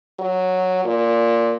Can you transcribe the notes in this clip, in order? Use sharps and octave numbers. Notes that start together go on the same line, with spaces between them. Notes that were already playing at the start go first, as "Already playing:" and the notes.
F#3
A#2